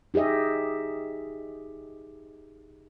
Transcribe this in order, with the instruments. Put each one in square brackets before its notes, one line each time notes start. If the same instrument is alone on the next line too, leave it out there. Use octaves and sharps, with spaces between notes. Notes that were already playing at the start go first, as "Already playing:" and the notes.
[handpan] D#4 G4 G#4 D#5 E5